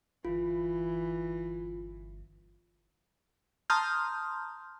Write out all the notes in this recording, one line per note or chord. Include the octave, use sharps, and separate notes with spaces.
G1 E3 F4
A5 A#5 C6 D#6 F6 G6